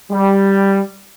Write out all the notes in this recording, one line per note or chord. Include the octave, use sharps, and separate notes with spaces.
G3